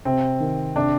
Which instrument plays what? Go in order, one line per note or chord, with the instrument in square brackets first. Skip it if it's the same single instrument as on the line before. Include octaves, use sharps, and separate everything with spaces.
[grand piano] C3 [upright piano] C4
[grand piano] D#3
[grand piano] C3 [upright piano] D4